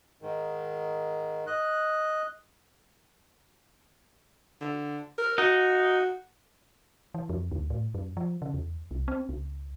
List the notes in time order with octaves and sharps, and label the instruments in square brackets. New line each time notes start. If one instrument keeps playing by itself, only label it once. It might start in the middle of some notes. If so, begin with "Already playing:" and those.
[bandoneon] G#2 D#3
D#5 F#6
[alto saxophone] D3
A#4
[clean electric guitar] D#4 [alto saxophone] F#4
[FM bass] E3
F2
D2
A2
F#2
F3
C#3
E2
C2
C4
C#2